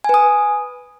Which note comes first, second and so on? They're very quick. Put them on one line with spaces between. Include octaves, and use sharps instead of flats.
G#5 B4 D#6